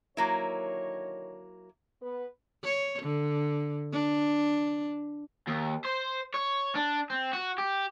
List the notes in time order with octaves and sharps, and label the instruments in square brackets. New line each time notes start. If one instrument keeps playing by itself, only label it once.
[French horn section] D3 D#3 C#5 [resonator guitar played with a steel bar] F#3 A#3 E4
[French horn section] B3 B4
[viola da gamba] C#5
D3
D4
[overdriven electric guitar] D#2
C5
C#5
D4
C4
F#4
G4